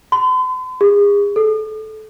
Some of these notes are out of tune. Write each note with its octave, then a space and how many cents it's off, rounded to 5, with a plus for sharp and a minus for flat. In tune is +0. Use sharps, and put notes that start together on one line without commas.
C6 -45
G#4 -35
A4 -25